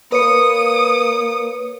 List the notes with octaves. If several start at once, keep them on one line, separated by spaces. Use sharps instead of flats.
A#3 B4 C#5 D#6 C#7